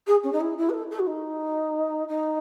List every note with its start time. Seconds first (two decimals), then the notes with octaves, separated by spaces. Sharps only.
0.07 G#4
0.23 C#4
0.32 D#4
0.40 E4
0.57 E4
0.69 B4
0.73 A4
0.91 A4
0.99 F#4
1.06 D#4
2.08 D#4